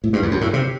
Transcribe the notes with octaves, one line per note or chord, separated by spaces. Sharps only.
A2
G2
E2
F#2
A2
C3